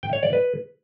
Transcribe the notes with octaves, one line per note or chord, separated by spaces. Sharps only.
G5
C#5
D5
B4